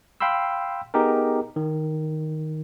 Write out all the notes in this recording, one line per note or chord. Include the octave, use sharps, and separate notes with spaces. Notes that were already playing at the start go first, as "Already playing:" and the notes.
F5 G5 B5 C6 E6
B3 D#4 G4 G#4 A#4
D#3